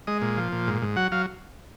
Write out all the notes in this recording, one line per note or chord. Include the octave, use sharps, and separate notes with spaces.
G#3 D#5
A#2
F3
A#2
G#2
G#2
F#3 F#5
F#3 F5